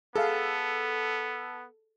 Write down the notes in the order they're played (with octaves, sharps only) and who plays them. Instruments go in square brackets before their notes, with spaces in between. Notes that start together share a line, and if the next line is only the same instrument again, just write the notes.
[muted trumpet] B3 [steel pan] G#4 F5 [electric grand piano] A4